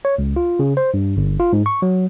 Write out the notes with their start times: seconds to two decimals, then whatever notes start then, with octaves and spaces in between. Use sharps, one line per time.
0.05 C#5
0.18 C#2
0.36 F4
0.59 C#3
0.77 C5
0.94 G2
1.17 G1
1.40 F4
1.53 G#2
1.66 C#6
1.82 F#3